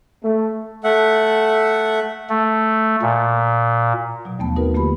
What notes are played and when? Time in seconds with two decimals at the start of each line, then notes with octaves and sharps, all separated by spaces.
0.24 A3
0.84 A3 E5 F#5
2.29 A3
3.02 A#2
4.25 B2 F#3
4.39 D#2 F3 A3 B3 A5
4.56 C4 D#4 F#4 A#4 B4
4.74 D3 A3 A#3 F4 G4 B5